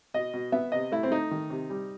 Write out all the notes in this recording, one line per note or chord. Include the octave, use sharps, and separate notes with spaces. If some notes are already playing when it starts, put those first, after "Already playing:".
B2 D#5
B2
B3 E5
C3 D#5
A3 E4
C4
A3 D#4
D#3
C3
G3